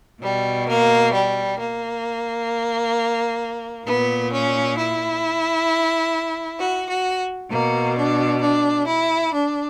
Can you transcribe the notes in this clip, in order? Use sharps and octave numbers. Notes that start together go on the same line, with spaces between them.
B2 G3
A#3
G3
A#3
A#2 B3
C#4
E4
F#4
F#4
B2 A#3
D4
D4
E4
D4